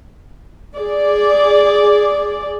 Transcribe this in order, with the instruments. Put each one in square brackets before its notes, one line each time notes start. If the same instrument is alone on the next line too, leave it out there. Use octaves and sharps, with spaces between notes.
[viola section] G#4 D5